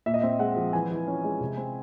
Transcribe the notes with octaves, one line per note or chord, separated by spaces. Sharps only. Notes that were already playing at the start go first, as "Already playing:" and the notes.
A#2 E5
D#5
C4 E5
G#3 F#5
F3
E3 G#5
E3
C#4
G#3
C3
C4